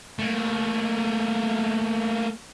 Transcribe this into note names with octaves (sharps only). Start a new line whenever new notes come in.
A3 A#3